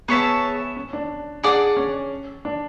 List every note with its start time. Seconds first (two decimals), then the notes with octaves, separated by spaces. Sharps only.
0.08 B3 G#4 C#5 E5 A5
0.76 C#4
0.93 D4
1.44 D4 G#4 D5 F#5
1.76 C#4
2.45 D4